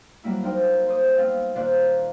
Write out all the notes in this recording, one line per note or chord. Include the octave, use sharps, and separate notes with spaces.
F#3 G3 A#3 E4
D#4 A#4 C5 D5 F5 G5
C5 D#6
B3 C4 F5 G5
A#2 D#3 C5 D5 F5 F#6